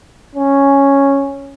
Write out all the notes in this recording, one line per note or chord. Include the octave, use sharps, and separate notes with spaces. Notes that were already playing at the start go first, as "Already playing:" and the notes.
C#4